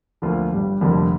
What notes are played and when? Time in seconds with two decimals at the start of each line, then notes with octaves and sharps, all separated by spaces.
0.22 D2 D3 F3 A#3 F4
0.52 G1 G2 G3
0.81 F1 F2 D3 G3 A#3